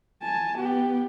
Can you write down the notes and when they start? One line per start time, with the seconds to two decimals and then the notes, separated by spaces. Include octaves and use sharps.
0.23 G#5 A5
0.57 B3 G4